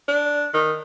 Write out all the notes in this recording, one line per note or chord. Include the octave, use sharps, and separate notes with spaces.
D4
D#3